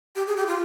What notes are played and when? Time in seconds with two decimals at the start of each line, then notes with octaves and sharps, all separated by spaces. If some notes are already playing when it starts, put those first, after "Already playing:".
0.16 G4
0.27 G#4
0.37 G4
0.47 F4